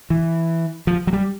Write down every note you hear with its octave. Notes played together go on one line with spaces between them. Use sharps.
E3
F3
F#3
G3